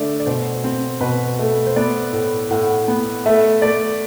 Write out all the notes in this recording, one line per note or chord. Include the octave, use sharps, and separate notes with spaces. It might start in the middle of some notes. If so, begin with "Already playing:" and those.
Already playing: D3 A3 D5 E5
D5
B2 C5
C4
B2 B4
A3
C5
B3 D5
A2
A2 F#5
B3
A3 E5
A3 D5